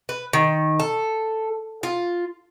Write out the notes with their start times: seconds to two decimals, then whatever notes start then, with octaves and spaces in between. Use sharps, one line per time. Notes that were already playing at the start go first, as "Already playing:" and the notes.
0.09 B4
0.33 D#3
0.80 A4
1.83 F4